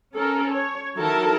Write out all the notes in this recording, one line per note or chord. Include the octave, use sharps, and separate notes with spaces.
C#4 A4 A#4
C#5
D#3 F#3 E4 A4 A#4 A5